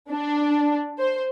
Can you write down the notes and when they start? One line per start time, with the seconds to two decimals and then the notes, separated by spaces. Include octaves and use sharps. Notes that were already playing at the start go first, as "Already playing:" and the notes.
0.11 D4
0.99 C5